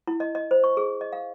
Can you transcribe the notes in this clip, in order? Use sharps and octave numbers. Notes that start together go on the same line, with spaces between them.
E4
D#5
D#5
C5
C#6
G#4
D#5
F5